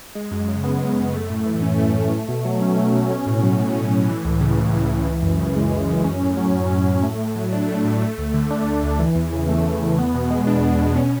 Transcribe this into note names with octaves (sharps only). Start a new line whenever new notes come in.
G#3
F#2
C#3
B3
G#3
F#2
A3
A2
E3
C#4
A3
A2
A3
B2
F#3
C#4
A3
B2
C#4
A2
F#3
A2
C#4
A2
E3
C#2
C#3
C#2
E3
C#2
E3
F#2
C#3
G#3
E3
F#2
C#4
A2
F#3
A2
C#4
A2
A3
A2
F#3
D4
A3
A2
A3
D2
D3
D4
A3
D2
E3
E2
C#3
A3
E3
E2
B3
B2
G#3
D4
B3
B2
C#4